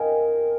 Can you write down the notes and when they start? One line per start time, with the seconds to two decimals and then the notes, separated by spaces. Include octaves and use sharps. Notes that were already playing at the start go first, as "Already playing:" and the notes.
Already playing: A#4 D#5 F5 G5 G#5